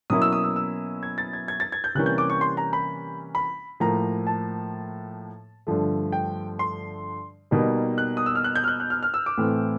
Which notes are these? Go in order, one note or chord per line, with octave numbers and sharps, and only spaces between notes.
B2 F#3 A#3 C#4 E4 D#6
E6
D#6
E6
E6
G#6
A6
G#6
G#6
A6
G#6
G6
C3 E3 G3 A#3 C#4 F#6
G6
D6
C#6
C6
A#5
B5
B5
A2 F3 A#3 A#5
A5
G2 D3 F3 A3
G5
C6
B2 G3 A#3 D#4
F#6
D#6
E6
F6
F#6
G6
F6
F#6
F#6
F6
F6
E6
D6
A2 E3 A3 C4